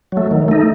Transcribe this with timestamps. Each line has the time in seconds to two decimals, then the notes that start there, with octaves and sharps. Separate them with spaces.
0.12 F#3 A3
0.31 D#3
0.48 A3 D#4